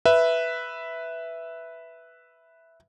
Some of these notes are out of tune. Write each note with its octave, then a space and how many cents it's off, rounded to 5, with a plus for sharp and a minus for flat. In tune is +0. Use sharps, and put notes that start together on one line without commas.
B4 +0 E5 +0